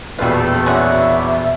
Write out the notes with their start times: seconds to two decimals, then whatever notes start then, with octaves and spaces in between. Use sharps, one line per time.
0.19 E1 A#1 G3 A3 F4 B4
0.66 G#3 C#4 D4 E4 F#4 E5